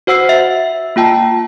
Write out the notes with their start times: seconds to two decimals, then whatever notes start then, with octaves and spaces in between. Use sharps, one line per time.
0.07 F#4 C5 F#5 E6 C7
0.29 E5
0.96 A#3 F4 G5 A5